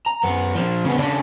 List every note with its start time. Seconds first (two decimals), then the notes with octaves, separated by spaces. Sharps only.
0.06 A#5
0.24 F#2 B3
0.56 A#2 F3
0.85 C#3 B3
0.98 C#3 D4